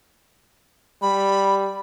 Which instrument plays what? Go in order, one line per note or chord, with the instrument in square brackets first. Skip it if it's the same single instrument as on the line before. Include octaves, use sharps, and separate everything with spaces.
[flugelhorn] G3 [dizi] B5